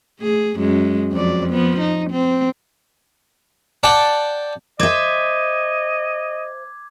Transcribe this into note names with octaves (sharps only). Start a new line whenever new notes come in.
A3 G#4
F#2 G#3
F2 F#3 D5
F3 B3
D#4
C4
D5 F#5 G5 A5
C5 D#5 E5 D6 G#6